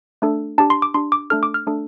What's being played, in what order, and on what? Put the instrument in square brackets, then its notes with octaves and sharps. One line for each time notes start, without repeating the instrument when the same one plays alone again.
[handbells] A3 D4 A4
D4 G4 A5
C6
D6
D4 G4 C6
D6
A3 D4 A4 F6
D6
F6
A3 D4 A4